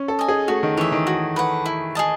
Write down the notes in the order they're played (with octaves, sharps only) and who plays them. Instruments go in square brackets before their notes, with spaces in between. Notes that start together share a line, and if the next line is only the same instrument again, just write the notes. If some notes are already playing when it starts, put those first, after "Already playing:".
Already playing: [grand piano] C#4
A4
[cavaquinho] D#5 G#5
[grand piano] G#4
[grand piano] A3 [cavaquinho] F#4
[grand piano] D#3
[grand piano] E3 [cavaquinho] C#5 E5
[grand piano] D#3
[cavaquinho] F#4
B4 F#5
E4
G#4 D#5 A5